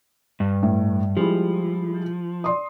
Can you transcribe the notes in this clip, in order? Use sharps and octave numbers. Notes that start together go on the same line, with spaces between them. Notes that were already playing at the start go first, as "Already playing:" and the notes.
G2
A2
F3 G3 G#3 E4
D5 C6 D#6